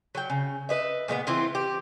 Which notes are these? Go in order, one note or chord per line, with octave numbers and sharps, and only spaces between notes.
F#3 G5
C#3
B4 D#5 E5
A#2 G#3 A3 B3
E3 C4 E4 F4
G4